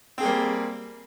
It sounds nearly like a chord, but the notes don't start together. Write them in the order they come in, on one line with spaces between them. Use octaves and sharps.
C4 G#4 A#3 G3